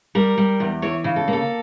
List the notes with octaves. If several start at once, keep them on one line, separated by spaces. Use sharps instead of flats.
G3 A#4
G3
E2
E3 C#5
C#3
A4
A#3
A4